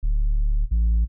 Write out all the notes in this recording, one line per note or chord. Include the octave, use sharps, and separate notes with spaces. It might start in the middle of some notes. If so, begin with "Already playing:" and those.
D1
A1